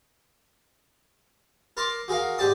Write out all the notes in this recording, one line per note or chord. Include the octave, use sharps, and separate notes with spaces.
A#4 A5 C6 D6
F#4 G#4 A#4 F5
G#2 G4 D5 A5 D#6